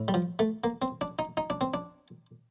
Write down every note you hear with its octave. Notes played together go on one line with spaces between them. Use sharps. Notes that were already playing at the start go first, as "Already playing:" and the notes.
Already playing: A2
G3
F3
A3
A#3
C4
D4
D#4
D#4
D4
C4
D4